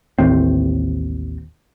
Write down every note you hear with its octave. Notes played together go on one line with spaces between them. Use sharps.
A1 D#2 A2 C4